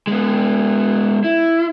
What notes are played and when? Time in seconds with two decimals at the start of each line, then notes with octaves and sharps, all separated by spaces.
0.07 G#3 B3
1.24 E4